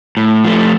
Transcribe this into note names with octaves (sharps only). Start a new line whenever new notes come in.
A2
F3 A3